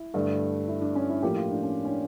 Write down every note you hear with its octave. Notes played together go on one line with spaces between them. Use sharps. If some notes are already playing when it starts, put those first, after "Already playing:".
Already playing: E4
G2 D3 A3
E4
D4
C#4
E4
A2 F3 A#3 G4
F4
D4
C#4
C#4
D4